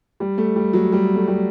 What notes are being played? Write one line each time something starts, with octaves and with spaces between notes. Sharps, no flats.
G3
A3
G3
F#3
G3
A3
G3